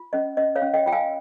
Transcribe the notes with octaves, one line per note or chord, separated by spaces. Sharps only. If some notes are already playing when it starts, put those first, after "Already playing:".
Already playing: F4
C#4 D#5
C#4 D#5
C#5 F5
C#4
D#5 G5
F4 G5
F5 G#5